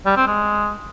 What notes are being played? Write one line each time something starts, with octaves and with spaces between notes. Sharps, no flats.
G3
C4
G#3